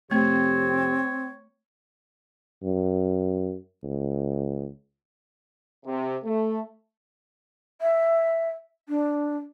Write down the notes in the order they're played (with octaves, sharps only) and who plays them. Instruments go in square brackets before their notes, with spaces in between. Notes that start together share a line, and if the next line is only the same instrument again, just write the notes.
[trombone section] F2 C3 G4 [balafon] A3 [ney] C4 [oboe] C#5
[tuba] F#2
C#2
[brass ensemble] C3
A3
[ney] E5
D4